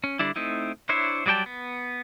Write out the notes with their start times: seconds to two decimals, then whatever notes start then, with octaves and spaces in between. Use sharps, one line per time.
0.04 C#4
0.19 D3 G3 D4 E4
0.36 A3 C4 D#4 E4
0.89 D4 E4 C5 C#5 E5
1.26 F#3 G3 D5 G5 A5
1.46 B3